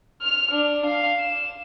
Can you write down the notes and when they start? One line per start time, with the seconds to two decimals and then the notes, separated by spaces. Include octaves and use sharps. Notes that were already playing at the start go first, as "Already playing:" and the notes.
0.21 F6 F7
0.52 D4
0.86 F5
1.20 E7